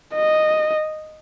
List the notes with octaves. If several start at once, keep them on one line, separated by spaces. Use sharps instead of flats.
D#5